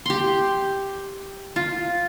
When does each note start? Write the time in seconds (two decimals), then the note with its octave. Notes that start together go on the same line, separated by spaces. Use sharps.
0.06 G4 C6
1.56 F4